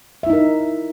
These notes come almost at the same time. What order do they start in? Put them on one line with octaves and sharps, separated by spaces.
E5 E4 D#4 A#4